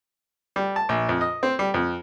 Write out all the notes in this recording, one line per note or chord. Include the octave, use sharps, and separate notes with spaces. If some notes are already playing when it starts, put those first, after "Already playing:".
G3
A5
A#1
F2
D#5
C4
G3
F2